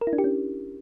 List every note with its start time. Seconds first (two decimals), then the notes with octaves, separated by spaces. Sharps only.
0.01 A#4
0.07 E4
0.13 D4
0.18 G4
0.24 C#4